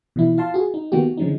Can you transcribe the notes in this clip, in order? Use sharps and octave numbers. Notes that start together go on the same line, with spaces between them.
B2 E3 F3 E4
F4 F5 A5 C6
F#4 G#4
D#4
D#3 A#3 B3 F#4 G4
D3 F3 G#3 C#4 D#4